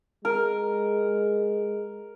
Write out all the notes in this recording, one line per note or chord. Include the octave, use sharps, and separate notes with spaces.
G#3 A#4